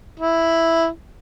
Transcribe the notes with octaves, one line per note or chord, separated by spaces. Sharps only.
E4